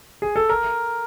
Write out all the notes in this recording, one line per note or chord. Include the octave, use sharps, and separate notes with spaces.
G#4
A4
A#4